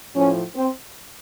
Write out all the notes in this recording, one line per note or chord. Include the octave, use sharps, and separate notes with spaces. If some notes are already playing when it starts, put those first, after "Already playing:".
A2 F3 C#4
C4